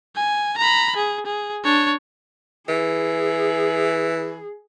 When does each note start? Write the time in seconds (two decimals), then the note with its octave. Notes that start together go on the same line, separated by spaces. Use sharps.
0.16 G#5
0.58 A#5 B5
0.96 G#4
1.26 G#4
1.64 D4 C#5
2.68 E3 G#4